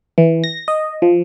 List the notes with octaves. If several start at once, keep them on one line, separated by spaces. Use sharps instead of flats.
E3
A#6
D#5
F3